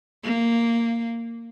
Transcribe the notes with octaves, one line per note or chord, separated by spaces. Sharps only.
A#3